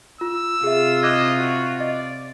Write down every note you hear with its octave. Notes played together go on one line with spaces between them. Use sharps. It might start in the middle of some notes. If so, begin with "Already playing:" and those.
F4 E6
C3 F4 G#4 E5
D#5 D6 F#6 G#6
F#4
D5 D#5